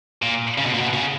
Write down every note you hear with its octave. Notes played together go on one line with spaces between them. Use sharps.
A#2
C#3
B2
A#2
B2
C#3